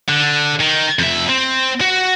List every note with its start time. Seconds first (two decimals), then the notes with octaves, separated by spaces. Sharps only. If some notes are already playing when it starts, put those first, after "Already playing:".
0.08 D3
0.60 D#3
0.99 F2 E5
1.29 C4
1.81 F#4